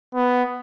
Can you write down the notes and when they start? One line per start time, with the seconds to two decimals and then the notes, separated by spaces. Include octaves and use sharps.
0.15 B3